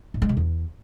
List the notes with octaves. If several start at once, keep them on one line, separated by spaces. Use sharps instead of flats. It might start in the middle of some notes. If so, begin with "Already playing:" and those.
A2
G#3
C3
E2